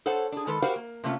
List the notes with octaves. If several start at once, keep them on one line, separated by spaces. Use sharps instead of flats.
A4 C5 C#5 F#5
D4 G#4
D#3 G#3 A4 B4
F#4 G4 A#4 C5 F5 F#5
A#3
C3 A3 A#3 C#4 F4